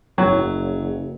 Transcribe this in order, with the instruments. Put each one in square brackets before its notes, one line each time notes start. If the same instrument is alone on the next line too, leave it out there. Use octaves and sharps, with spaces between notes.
[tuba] F#1 [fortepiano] F#3